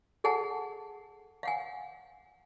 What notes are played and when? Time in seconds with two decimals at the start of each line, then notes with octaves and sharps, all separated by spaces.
0.24 G#4 A4 F#5 G#5 A5
1.43 F5 F#5 G#5